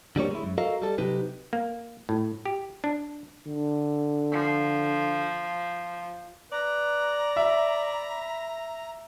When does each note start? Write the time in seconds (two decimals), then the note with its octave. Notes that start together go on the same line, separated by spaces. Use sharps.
0.16 D3 G3 A#3 C#5
0.31 G#3 E4
0.43 F#2
0.58 F#4 A4 A#4 D#5 F5
0.82 G3 A4
0.98 C3 F#3 D#4 G4 B4
1.53 A#3
2.09 A2
2.46 G4
2.84 D4
3.47 D3
4.32 F3
6.52 B4 D5 A#5
7.36 E5 B5